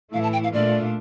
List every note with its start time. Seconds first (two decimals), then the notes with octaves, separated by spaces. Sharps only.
0.13 A2 E3 A3 E4 F5
0.23 A5
0.33 G5
0.44 F5
0.53 A#2 A3 D4 F4 D5